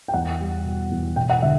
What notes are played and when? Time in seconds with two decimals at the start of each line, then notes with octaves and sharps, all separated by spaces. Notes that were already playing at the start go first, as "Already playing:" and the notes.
0.08 G5
0.14 E2 F#5
0.40 G3
0.65 B2
0.91 E2
1.16 E1 G5
1.30 F#5
1.42 D3 E5